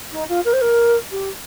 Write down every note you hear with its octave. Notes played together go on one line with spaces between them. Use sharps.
D#4
F4
A#4
C5
A#4
G4